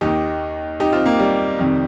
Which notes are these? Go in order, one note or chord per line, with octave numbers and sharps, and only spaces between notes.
D#2 D#3 D#4 G4
D#4 G4
C4 F4
A#3
G3
F2 C3 D#3